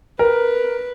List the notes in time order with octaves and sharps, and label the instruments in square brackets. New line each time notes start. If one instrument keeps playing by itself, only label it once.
[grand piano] A#4 [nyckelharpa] B4